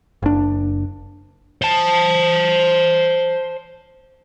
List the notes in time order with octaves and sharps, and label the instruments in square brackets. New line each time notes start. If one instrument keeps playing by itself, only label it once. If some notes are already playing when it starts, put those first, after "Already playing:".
[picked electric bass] F#1 D4
[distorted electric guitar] C5 A5